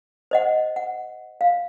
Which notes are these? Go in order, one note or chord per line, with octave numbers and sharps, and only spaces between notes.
C5 D#5 F#5
F#5
F5